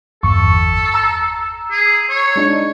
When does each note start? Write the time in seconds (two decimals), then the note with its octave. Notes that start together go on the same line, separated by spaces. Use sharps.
0.23 G1 E2 A4 C#6
0.94 A#5 E6
1.71 G#4
2.10 C#5
2.36 G#3 D4 D#4